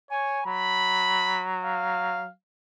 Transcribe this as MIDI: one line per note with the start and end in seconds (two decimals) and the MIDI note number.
0.11 0.40 73
0.11 0.42 80
0.46 2.31 54
0.46 1.47 83
1.64 2.29 77